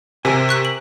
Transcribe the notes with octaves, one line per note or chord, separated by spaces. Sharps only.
C3 A#4 C5 G#5
C#6 F#6 B6
F#7